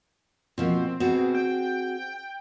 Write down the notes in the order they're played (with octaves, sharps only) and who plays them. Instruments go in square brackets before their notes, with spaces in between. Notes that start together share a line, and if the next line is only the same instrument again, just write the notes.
[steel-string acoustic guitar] B2 F3 A#3 [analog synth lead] C4
[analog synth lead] B2 [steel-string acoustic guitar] C4 F#4 G#4
[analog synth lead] G5